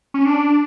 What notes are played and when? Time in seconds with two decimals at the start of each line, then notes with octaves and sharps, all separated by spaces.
0.14 C#4
0.26 D4